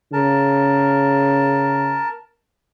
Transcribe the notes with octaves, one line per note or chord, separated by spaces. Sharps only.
C#3 A#4 A5